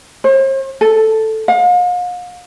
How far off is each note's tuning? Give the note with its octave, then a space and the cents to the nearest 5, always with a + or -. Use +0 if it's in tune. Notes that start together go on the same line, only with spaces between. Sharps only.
C5 +45
A4 +0
F5 +40